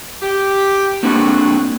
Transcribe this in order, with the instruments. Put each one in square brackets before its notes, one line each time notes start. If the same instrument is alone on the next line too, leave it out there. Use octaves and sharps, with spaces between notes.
[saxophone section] G4
[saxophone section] A2 G#3 F#4 [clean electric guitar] A#3 C4 D4